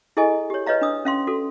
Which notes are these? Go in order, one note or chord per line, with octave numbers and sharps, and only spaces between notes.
E4 G#4 A4 D#5 G#5
G4 C#5
B4 C#5 D#5 F5 A#5
D4 D#6 E6
C#4 F5 C6
F#4 A4